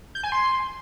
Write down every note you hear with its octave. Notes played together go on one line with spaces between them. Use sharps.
G6
G#5
C6